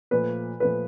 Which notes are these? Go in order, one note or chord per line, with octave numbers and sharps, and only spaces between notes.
A#2 F3 A3 B4
A#2 F3 A3 B4